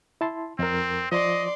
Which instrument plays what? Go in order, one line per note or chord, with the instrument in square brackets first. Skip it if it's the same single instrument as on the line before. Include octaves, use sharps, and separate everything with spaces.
[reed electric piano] E4 A5 C6
[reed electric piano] F2 A#4 [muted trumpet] C4
[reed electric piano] F3 [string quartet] D5 C6 [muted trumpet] D#5